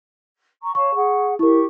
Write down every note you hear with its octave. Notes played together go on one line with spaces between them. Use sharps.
A#5 C#6
C#5 F5 A5 C#6
G#4 F#5
E4 G4 A#4 C#6